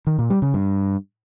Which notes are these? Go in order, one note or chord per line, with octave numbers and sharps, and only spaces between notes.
D#3
A#2
G3
C#3
G2